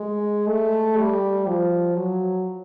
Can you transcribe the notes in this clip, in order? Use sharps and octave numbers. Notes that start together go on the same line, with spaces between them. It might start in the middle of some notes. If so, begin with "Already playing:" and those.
Already playing: G#3
A3
G3
F3
F#3